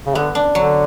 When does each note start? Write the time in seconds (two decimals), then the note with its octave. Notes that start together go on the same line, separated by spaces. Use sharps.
0.06 C#3
0.15 D3 B3
0.35 D4
0.54 D3 F#3